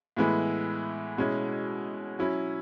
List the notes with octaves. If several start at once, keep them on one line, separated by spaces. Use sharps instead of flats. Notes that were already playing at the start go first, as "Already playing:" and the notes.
A2 E3 G#3 B3 E4
B2 G#3 C#4 E4
F#3 C#4 E4